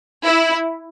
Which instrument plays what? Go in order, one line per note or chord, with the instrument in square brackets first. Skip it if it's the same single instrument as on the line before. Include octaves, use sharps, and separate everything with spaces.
[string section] E4